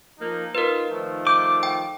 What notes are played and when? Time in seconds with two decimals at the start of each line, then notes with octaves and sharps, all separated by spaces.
0.20 F3 A#3 D#4
0.55 D#4 F4 A#4 B4
0.91 D#3 F3 A3
1.27 D6 G6
1.63 G5